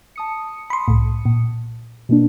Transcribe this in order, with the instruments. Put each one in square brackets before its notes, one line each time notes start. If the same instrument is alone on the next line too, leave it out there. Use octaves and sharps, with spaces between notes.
[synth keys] A5 D#6 C#7
[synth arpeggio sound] B5 C6
C2 A2
A#2
[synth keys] B2 A#3 D4